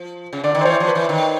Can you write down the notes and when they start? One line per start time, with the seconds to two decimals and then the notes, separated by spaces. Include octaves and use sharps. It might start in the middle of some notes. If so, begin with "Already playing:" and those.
Already playing: F3
0.33 C#3
0.44 D3 D5
0.55 D#3
0.61 C5
0.65 E3 C#5
0.80 F3
0.88 B4
0.95 E3
1.09 D#3